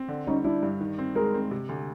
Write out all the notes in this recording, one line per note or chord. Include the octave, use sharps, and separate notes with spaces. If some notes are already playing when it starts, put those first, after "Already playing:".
Already playing: C4
D3
G3 C#4 D#4
G3 D4 E4
G2
D#3
C4
G#3 G#4 A#4
C4
C3
D2